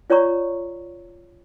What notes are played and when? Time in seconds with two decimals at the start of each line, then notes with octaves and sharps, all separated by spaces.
0.10 F4 C#5 D5 A#5 C#6